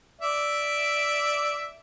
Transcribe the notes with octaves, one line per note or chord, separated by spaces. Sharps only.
D5 E5